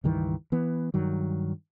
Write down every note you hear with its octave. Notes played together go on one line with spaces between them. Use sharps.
C#2 G2 D#3 E3
E3 B3
G2 D#3 F#3